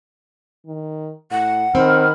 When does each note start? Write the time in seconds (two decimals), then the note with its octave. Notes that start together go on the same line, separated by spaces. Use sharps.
0.66 D#3
1.31 A2 F#5
1.75 D#3 C4 B5 F6